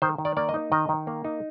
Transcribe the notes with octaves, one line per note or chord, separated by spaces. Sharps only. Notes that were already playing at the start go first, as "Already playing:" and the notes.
D#3 C5
D#3
D5
A#3 D5
D#5
D#4
D#3 D#5
D#3
A#3
D#4